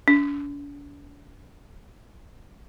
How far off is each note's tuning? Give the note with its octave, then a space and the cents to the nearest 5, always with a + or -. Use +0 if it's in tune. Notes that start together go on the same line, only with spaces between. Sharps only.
D4 -45